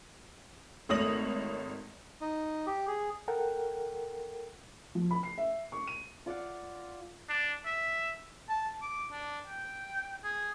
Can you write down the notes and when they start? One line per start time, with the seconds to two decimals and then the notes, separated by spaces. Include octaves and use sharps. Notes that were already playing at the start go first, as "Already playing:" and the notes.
0.89 G#1 A3 C#5 D#6 A#6 F#7
2.21 D#4
2.67 G4
2.87 G#4
3.28 A4 A#4 F#5 G5
4.95 F3
5.11 B5
5.23 C7
5.38 E5
5.72 C#6
5.87 D#7
6.26 F4 D5 F5 F#5
7.29 D4
7.66 E5
8.49 A5
8.82 D6
9.12 D4
9.47 G5
10.24 G#4